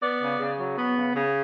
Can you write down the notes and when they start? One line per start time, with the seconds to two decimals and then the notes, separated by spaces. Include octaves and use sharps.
0.02 B3 D5
0.21 C#3
0.39 C#3
0.59 F#3
0.77 B3
0.96 C#3
1.15 C#3